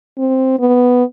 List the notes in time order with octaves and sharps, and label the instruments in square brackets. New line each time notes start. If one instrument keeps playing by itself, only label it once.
[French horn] C4
B3